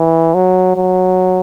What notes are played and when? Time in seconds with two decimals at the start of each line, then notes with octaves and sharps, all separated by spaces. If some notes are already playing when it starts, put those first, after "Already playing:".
Already playing: E3
0.35 F#3
0.76 F#3